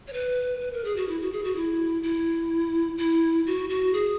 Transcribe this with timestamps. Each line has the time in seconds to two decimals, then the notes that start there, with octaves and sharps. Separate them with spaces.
0.07 C#5
0.13 B4
0.61 B4
0.73 A#4
0.85 G#4
0.96 F#4
1.08 E4
1.21 F#4
1.32 G#4
1.44 F#4
1.56 E4
2.03 E4
2.98 E4
3.46 F#4
3.69 F#4
3.93 G#4